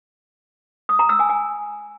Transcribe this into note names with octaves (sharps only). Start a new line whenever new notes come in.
D#6
A#5
E6
G#5
G#5